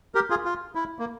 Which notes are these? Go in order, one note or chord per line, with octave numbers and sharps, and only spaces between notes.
G4 A#4
F4 G#4
F4
E4
A#3